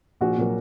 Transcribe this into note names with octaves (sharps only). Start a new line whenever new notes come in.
A#1 F#4
A#2 F#3 A#3